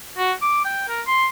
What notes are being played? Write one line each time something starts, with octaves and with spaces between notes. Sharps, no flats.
F#4
D6
G5
A#4
C6